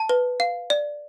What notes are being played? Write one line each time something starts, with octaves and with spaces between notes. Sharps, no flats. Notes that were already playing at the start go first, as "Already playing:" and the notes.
Already playing: A5
B4
F5
D5